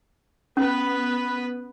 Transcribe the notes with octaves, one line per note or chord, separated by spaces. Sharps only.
B3 C#4 B4